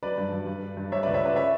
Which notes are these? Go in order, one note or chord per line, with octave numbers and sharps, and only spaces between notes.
F#3 B4 D5
G2
G2
G2
G2
G2
G3 C#5 E5
B4 D5
C#2
C#5 E5
C#3 B4 D5
C#5 E5